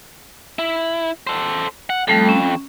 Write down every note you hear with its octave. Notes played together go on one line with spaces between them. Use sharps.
E4
A4 C5
F#5
F2 G3 A3 A4
C#4